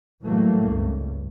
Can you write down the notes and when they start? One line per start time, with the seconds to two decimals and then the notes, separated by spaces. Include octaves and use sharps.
0.23 A2 E3 F#3 G3 A3 A#3
0.67 G#1 C#2 G2